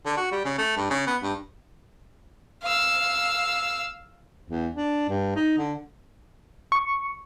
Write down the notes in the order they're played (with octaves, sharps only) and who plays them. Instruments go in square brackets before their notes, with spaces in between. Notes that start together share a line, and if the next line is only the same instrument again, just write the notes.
[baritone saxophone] D3
F#4
G3
C#3
A3
G2
C#3
B3
G2
[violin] F5 E6
[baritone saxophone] E2
D4
G2
D#4
D3
[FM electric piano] C#6